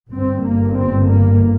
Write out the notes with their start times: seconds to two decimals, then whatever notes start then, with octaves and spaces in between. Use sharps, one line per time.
0.13 G1 G2 C4
0.44 A#3
0.75 C4
1.06 A#3